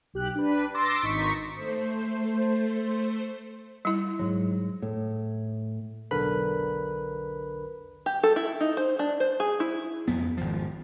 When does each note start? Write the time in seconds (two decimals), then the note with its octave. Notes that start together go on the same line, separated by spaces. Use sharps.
0.14 B1 G4 F#6
0.35 D4 B4
0.74 C6 D6 E6 A6 A#6
1.03 G#1 D#4 C#6 B6 C#7
1.55 A3 C5
3.85 G3 E4
4.19 G#2 F#3
4.82 A2
6.11 B1 E2 D3 A#4 B4 B5
8.06 G4
8.23 A4
8.36 E4
8.60 D#4
8.77 C5
8.99 D4
9.20 C5
9.40 G#4
9.60 E4
10.08 F2 B3
10.37 G#1 F3